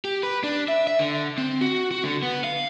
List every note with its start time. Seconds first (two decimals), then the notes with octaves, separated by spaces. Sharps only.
0.05 G4
0.23 B4
0.43 D4
0.68 E5
0.87 E5
0.99 D3
1.38 C4
1.61 F#4
1.91 F#4
2.04 D3
2.23 B3
2.44 F5